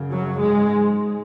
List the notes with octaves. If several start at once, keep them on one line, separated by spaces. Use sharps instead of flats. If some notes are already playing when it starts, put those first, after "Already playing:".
Already playing: F#2 C#3
F#3
G#2 G#3